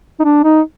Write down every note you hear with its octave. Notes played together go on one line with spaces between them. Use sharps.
D#4
D4
D#4